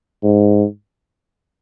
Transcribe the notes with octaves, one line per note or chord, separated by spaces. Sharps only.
G#2